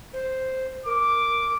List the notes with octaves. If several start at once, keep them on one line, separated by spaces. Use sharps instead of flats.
C5
A#4 D6